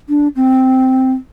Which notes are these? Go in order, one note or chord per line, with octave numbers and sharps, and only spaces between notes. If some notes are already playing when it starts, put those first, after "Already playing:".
D4
C4